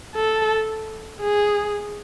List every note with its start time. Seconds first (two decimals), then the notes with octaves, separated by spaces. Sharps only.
0.16 A4
1.21 G#4